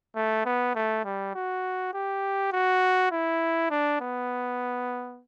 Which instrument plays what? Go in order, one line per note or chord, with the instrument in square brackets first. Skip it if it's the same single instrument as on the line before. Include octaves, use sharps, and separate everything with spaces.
[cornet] A3
B3
A3
G3
F#4
G4
F#4
E4
D4
B3